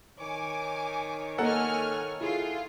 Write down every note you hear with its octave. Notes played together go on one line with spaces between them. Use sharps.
D#3 C#5 G#5 D6
A#3 A4 D#5 F#5 G#5 F6
E4 F4 G#4